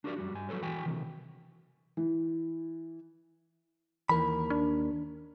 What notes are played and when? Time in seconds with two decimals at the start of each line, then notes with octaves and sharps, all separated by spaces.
0.04 D4 F#4 G4 A#4 C5 D5
0.16 F#2 G3 F#4
0.33 G2 G#5
0.49 F#3 F#4 A4 B4 C#5
0.61 E2 E3 F#4 G5 G#5
0.86 C3 D#3 E3 C4
1.97 E3
4.09 D#2 E3 A#4 B5
4.50 D4